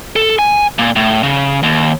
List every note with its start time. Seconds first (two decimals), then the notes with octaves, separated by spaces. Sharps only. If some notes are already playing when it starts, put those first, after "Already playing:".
0.16 A4
0.39 G#5
0.79 A#2
0.96 A2
1.23 C#3
1.63 D#2